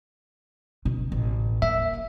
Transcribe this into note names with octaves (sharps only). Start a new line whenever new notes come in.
B2 C#4
A1
A#3 E5